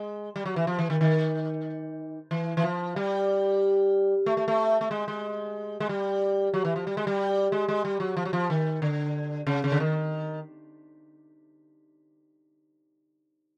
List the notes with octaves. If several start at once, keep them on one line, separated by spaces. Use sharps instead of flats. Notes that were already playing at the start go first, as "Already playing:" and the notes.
Already playing: G#3
G3
F#3
E3
F3
E3
D#3
D#3
E3
E3
F3
G3
A3
A3
A3
A3
G#3
G#3
G#3
G3
F#3
E3
F3
G3
G#3
G3
G#3
G#3
G3
F#3
F3
F#3
F3
D#3
D3
C#3
C#3
D3
D#3